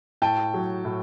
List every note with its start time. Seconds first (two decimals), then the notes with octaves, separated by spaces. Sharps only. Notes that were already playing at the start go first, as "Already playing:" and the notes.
0.22 A2 G5 A5
0.54 F#3
0.85 A2